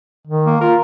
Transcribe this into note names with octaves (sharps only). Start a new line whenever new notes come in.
D#3
A#3
F4 A#4